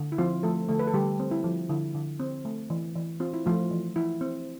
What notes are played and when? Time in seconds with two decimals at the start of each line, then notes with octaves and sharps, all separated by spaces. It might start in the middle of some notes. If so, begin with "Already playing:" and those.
Already playing: D3
0.12 E4
0.18 F3 C4 F4
0.43 F3 A3 A4
0.69 D3 A3 A4
0.79 B4
0.87 A4
0.94 D3 G3 G4
1.20 C4
1.31 E4
1.44 F3
1.70 D3 E4
1.94 D3
2.20 C4
2.45 A3
2.70 E3
2.96 E3
3.20 C4 F4
3.33 E4
3.46 F3 A3 F4
3.71 E3
3.96 E3 E4
4.21 C4